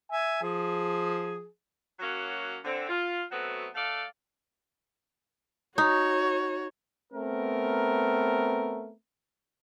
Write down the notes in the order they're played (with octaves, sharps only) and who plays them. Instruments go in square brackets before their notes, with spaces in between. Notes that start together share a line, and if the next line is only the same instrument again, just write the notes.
[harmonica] E5 G#5
F3 G#4
[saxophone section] F#3 A#3 C#4 F#4
D3 C4
F4
F#3 A3 B3 C4 F#4
A3 A4 D5 F5
[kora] D#4 [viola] F#4 C#5
[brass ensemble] A3 B3 C4 A#4